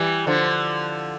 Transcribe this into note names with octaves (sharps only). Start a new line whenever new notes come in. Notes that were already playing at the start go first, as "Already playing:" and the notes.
Already playing: E3 G3
D3 F3